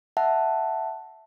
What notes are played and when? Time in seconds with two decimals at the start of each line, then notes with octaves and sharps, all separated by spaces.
0.17 E5 F#5 A5